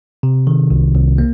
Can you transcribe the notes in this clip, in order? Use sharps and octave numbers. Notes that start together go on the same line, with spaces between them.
C3
D#3
C2
C2
A#3